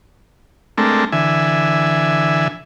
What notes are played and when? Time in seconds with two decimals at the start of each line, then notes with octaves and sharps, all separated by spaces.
0.78 G#3 A3 C4 D4 A4 A#4
1.12 D3 E3 E5 G#5